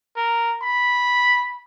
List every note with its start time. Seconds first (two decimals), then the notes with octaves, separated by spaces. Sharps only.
0.16 A#4
0.63 B5